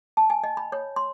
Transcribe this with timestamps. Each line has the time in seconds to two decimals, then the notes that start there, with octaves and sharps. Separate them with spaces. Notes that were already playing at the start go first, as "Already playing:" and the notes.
0.17 A5
0.30 G#5
0.44 D#5
0.57 B5
0.72 C#5
0.96 C6